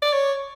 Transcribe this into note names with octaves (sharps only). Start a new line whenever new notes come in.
D5
C#5